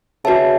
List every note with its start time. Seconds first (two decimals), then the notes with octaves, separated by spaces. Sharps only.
0.25 C#3 F#4 B4 E5 A5